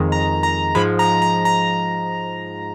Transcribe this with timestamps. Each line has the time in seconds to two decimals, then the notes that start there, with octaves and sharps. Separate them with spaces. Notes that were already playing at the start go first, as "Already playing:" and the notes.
Already playing: F2 D#3 G#3
0.12 A#5
0.43 A#5
0.75 G#2 F3 G#3 B5
0.99 A#5
1.22 A#5
1.45 A#5